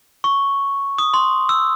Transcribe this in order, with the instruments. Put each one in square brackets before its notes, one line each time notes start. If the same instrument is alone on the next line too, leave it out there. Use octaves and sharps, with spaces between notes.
[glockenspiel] C#6
D#6
C6
E6